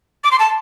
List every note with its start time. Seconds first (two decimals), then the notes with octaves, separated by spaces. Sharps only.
0.24 D6
0.31 C6
0.39 A5